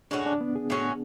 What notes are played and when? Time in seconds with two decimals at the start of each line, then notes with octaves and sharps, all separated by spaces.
0.11 A2 G#3 C#4 D4 F#4
0.26 D4
0.41 B3
0.55 G#4
0.70 A2 G#3 C#4 F#4